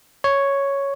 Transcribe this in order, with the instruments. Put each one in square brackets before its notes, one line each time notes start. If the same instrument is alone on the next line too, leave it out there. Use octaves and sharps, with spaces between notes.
[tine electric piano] C#5